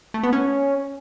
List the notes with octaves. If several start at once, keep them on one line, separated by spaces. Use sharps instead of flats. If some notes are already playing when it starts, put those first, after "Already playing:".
A3
B3
C#4